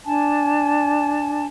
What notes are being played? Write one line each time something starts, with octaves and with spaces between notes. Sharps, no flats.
D4 G#5 A5